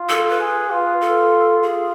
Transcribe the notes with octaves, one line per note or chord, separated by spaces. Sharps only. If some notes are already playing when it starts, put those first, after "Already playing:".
Already playing: F4
A4
B4
G#4
F4
A4
F4 G#4